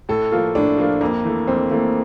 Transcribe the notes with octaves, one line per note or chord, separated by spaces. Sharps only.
A2 A4
F3 A#3 F4
A2 D4
F3 A#3 F4
F2 A#3
E3 A3
F2 C4
E3 A3 A#3